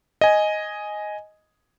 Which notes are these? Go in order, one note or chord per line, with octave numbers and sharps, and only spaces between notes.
D#5 G#5